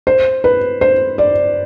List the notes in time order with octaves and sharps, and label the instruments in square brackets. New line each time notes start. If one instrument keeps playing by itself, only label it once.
[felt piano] C5
B4
C5
D5